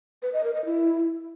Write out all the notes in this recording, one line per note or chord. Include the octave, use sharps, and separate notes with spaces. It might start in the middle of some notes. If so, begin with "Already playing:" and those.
B4
D#5
A#4
D#5
E4